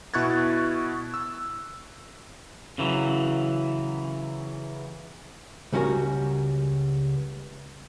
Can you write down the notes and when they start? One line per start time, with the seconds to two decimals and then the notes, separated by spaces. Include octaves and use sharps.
0.14 B2 E4 C#6 F#6 G#6 A6
1.14 E6
2.78 C#3 E3 F#3
5.73 C#2 G3 C#4 F#4 A#4